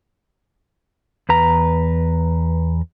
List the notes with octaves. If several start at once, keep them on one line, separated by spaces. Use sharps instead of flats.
E2 B4 A#5